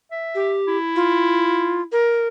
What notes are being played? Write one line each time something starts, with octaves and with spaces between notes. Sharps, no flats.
E5
G4
E4
F4
A#4